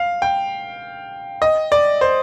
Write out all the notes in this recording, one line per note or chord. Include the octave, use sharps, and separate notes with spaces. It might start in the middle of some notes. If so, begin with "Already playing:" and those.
Already playing: F5
G5
D#5
D5
C5